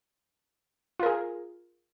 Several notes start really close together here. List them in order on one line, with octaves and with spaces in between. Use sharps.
F4 A#4 G#4